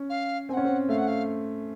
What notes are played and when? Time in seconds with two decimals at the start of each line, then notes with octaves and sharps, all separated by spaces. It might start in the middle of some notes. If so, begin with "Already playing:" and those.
Already playing: C#4
0.09 F5
0.49 C4 G#5
0.53 C#4 F#5
0.65 C4
0.89 A3 F5
0.98 F#5
1.07 F5